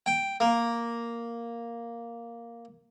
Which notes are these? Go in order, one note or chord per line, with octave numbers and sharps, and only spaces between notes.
G5
A#3